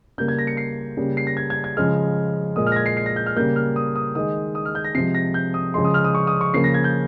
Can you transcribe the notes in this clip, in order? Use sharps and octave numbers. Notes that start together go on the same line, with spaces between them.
C#3 G3 A#3 G6
G#6
A#6
C#7
C7
C#3 G3 A#3
C7
A#6
G#6
G#6
G#6
C#3 F3 G#3 F6
A#2 G#3 D#6
F6
A#6
G#6
C7
C7
A#6
G6
F6
C#3 G3 A#3 G6
F6
D#6
D#6
D#3 G#3 D#6
D#6
F6
G6
A#6
C3 F3 G#3 C7
A#6
G6
D#6
C#3 F3 G#3 C6
D#6
F6
D#6
C#6
D#6
C#6
C#3 F3 A#3 C7
A#6
G#6
G6